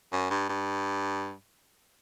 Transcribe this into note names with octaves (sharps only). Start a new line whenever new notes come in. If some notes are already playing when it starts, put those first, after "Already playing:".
F#2
G2
G2